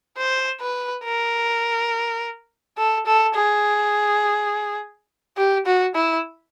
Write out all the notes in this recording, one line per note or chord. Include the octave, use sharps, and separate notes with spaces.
C5
B4
A#4
A4
A4
G#4
G4
F#4
E4